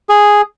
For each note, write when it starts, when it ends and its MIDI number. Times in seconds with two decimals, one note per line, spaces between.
0.09 0.42 68